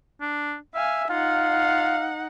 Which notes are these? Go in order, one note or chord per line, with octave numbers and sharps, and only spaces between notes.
D4
E5 F5 G#5
D#4 F4 F5 F#5